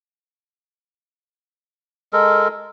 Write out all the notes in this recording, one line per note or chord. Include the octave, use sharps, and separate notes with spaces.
G#3 A4 A#4